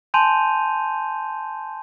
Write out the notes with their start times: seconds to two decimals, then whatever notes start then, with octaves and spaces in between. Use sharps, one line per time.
0.14 G#5 A5 C6 G6 D#7 F7